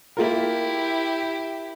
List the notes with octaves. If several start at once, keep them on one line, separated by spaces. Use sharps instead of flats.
A#3 E4 F4 G4 A#4